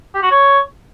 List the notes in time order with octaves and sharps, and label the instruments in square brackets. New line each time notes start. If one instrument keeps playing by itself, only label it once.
[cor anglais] G4
F#4
C#5